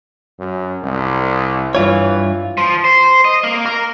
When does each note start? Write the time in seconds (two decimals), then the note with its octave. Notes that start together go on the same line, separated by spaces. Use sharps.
0.39 F#2
0.83 C2
1.75 G2 E3 F4 C#5
2.58 F3
2.85 C5
3.25 D#5
3.44 A#3
3.66 A#4